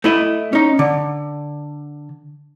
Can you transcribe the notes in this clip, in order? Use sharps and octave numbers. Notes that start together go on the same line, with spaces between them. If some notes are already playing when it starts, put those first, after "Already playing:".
A3 E4 D#5
C#4 D#4
D3